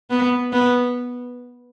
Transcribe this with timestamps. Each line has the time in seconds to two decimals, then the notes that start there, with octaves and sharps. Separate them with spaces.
0.10 B3
0.53 B3